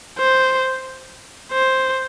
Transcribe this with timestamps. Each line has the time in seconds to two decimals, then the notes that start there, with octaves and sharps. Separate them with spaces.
0.18 C5
1.52 C5